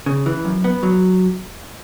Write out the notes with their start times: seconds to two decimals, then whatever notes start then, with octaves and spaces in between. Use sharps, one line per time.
0.06 C#3
0.26 E3
0.45 F#2
0.64 B3
0.83 F#3